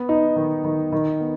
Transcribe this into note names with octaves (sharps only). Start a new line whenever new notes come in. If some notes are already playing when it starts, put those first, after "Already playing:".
Already playing: B3
D#4
D#3
D#3
D#3
B3